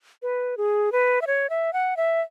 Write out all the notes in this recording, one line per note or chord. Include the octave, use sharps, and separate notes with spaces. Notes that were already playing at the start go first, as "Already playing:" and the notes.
B4
G#4
B4
E5
C#5
E5
F#5
E5